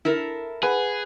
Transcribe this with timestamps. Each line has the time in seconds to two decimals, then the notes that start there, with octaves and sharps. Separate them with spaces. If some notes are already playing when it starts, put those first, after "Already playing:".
0.05 E4 A4 A#4
0.63 G#4 B4 F#5